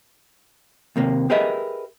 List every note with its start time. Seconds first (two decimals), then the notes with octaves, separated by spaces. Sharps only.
0.96 D#2 C3 A#3
1.30 G4 G#4 A#4 B4 D#5 E5